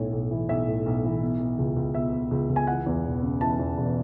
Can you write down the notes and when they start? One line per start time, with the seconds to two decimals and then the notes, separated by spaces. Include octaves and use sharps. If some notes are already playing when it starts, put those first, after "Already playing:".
Already playing: B1 A2 C#5
0.12 B1
0.31 E3
0.49 B1 E5
0.68 A2
0.86 B1
1.04 E3
1.21 B2
1.40 B2
1.58 C#2
1.77 C#2
1.94 B2 E5
2.13 B2
2.31 C#2
2.50 C#2
2.56 G#5
2.67 E3 F#5
2.86 E2
3.05 E1
3.23 C#3
3.41 E3 A5
3.59 E2
3.78 E1